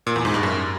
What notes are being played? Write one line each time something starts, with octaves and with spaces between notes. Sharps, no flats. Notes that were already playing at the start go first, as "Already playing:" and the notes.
A#2
E2
G#2
G2
F#2